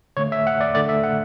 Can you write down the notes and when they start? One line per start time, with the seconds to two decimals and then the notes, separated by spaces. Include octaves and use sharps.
0.17 D3 A3 C#5
0.32 E5
0.47 F#5
0.61 D5
0.75 D3 A3 D5
0.89 E5
1.04 F#5